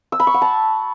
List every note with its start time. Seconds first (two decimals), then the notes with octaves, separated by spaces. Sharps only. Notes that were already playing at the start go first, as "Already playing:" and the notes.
0.12 E6
0.20 B5
0.27 C#6
0.34 F#5
0.42 A5